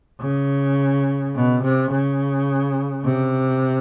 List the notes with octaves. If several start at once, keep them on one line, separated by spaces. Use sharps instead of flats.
C#3
B2
C3
C#3
C3